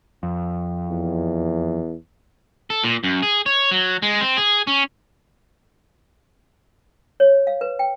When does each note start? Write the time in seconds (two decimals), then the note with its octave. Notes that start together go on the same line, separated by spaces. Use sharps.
0.23 F2
0.89 E2
2.70 A4
2.84 A#2
3.04 F#2
3.23 G#4
3.46 C#5
3.71 F#3
4.02 G#3
4.21 C4
4.37 G#4
4.67 C#4
7.20 C#5
7.47 F5
7.61 B4
7.79 G5